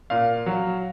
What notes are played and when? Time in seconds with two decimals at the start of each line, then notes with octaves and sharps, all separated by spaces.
0.10 A#2 F5
0.46 F#3